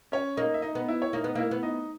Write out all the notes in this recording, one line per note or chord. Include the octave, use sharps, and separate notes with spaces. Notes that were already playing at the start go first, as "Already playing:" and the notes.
C#4 C#5
A#3 D#4 D#5
E5
D#4 D#5
B3
E4 E5
C#5
A#3 D#4 D#5
B3
A#3 E4 E5
B3
D#4 D#5